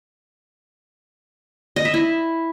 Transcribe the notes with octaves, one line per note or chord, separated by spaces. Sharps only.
D#5
E5
E4